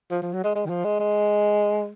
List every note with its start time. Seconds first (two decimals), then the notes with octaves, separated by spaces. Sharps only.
0.11 F3
0.22 F3
0.33 F#3
0.44 G#3
0.55 G#3
0.65 D#3
0.69 F3
0.84 G#3
0.99 G#3